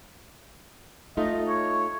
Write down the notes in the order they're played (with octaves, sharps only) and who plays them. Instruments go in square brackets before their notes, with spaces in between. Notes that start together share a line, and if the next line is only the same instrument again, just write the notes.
[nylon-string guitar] A3 D#4 F4 [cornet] D#5
[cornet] C#5